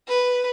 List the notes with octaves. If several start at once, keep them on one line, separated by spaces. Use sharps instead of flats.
B4